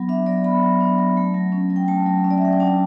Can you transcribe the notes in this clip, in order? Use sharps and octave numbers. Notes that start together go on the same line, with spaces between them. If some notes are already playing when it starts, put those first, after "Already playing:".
Already playing: F#3 B3
D4 E5
F#3 D5
B3 B5
F#3
D4
F#3
A3
F#3
C#4
F#3
G5
A3 A5
F#3
C#4
D5
E5
F#3 F#5
G5
D4 A5